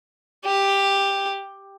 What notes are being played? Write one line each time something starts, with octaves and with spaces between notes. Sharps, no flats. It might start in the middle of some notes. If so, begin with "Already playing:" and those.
G4